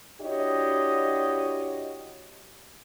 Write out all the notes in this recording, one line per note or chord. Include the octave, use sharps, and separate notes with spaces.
D4 E4 F#4 G4 C#5 D#5